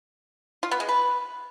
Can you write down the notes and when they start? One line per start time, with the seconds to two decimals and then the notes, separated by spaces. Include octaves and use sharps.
0.63 F4
0.71 B3
0.80 G#3
0.89 B4